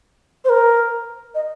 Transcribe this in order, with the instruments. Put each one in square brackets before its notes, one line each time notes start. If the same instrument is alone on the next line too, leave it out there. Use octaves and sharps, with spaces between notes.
[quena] C5
A#4
D#5